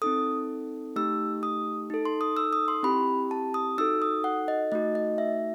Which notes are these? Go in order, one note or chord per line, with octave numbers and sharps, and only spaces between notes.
C4 D#4 A4 D#6
A3 D#4 G4 E6
D#6
D#4 A4
C6
D#6
E6
D#6
C6
C4 E4 G4 B5
A5
D#6
D#4 F#4 A4 E6
D#6
F#5
D#5
A3 D#4 F#4 D#5
D#5
E5